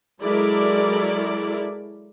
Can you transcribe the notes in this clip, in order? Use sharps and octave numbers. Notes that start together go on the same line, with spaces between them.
F#3 G#3 E4 A4 A#4 D5